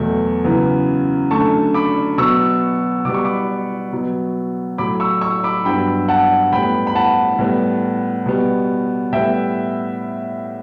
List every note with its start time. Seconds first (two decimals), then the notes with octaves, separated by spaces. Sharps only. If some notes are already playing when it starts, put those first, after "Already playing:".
Already playing: E2 B2 F#3 A3
0.44 F#2 C#3 E3 B3
1.31 F#2 D3 A3 A5 C#6
1.74 B5 D6
2.18 B2 F#3 B3 C#6 E6
3.05 B2 G3 B3 D6
3.14 C#6
3.24 B5 D6
3.92 B2 F#3 B3
4.78 A2 F#3 A3 B5 D6
5.00 C#6 E6
5.21 C#6 E6
5.44 B5 D6
5.65 G2 F#3 B3 G5 B5
6.08 F#5 A5
6.52 A2 G3 B3 G5 B5
6.87 B5
6.95 F#5 A5
7.39 A2 G3 B3
8.26 B2 G3 B3
9.13 A2 G3 B3 E5 G5